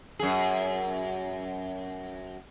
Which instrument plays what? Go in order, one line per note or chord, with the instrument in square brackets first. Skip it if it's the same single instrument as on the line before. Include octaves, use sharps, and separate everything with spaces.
[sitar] F#2 G#4